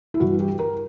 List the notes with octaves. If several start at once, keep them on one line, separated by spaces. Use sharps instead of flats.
E4
G2 E3 G3 F#4
G4
A#4